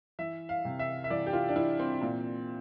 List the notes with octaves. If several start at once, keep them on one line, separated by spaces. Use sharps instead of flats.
E3 E5
F5
C3
E5
E5
E3 D5
G4
F4
D4
E3 E4
C4
A#2